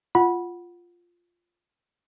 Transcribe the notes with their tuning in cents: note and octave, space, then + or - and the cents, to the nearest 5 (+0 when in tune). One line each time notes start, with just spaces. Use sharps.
F4 +0 F#5 +0 B5 -20